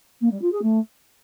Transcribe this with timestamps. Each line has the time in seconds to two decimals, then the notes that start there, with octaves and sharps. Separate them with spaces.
0.21 A#3
0.31 G3
0.41 F4
0.52 G#4
0.62 A3